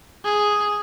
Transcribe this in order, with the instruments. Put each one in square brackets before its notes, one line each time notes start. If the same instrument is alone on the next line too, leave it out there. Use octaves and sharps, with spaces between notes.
[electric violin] G#4